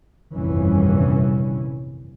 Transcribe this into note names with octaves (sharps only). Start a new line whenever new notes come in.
F1 A#1 G2 D#3 E3 C#4